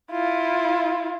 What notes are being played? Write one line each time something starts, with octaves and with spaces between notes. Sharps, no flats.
E4 F4